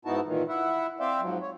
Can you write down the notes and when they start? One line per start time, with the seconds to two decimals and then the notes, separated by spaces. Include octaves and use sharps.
0.05 G#2 B3 D#4 E4 F#4 A5
0.25 A#2 D#3 E3
0.49 E4 E5 F#5
1.00 C4 C5 D5 E5 F5 G5
1.21 G#2 F3 F#3
1.42 C#5